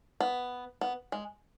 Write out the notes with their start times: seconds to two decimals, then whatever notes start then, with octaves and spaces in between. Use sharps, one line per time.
0.20 B3
0.81 B3
1.12 G#3